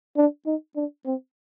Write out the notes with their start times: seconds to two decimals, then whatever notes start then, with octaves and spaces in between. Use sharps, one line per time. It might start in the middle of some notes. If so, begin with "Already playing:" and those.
0.17 D4
0.46 D#4
0.76 D4
1.06 C4